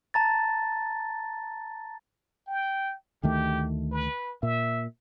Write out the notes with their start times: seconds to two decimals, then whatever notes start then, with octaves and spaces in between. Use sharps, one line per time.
0.14 A5 A#5 A6
2.47 G5
3.23 D2 D#3 A3 G4
3.92 B4
4.43 A#2 E5